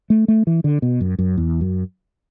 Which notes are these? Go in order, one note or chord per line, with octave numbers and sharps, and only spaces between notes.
A3
A3
E3
D3
B2
F#2
F#2
E2
F#2